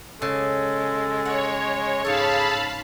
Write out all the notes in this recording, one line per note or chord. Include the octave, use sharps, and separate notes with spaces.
C#3 G#3 A4
C#5 F#5
G#2 G#4 A4 C#5 F5 A5 B5